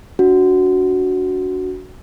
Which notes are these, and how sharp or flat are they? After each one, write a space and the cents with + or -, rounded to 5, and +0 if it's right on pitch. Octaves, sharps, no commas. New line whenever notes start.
D4 -30 F#4 +0